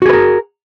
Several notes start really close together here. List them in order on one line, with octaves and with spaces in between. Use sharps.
F#4 G#4 B4 A#4